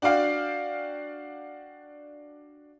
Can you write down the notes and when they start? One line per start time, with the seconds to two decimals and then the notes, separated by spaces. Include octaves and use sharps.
0.02 D4 F#4 D5 F5 G5